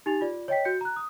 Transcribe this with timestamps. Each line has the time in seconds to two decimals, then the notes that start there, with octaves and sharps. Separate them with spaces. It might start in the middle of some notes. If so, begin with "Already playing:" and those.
0.06 D#4 G4 G#5 A6 F7
0.21 F4 D5
0.48 C#5 D#5 G5 B6
0.65 F#4 G6 C#7
0.81 A#5 F#6
0.96 D#6